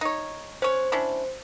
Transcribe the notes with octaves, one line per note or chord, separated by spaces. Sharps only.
D#4 C#5
C#4 C5 C#5
C#4 D4 E4